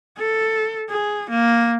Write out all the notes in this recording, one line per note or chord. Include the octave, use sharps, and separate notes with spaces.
A4
G#4
A#3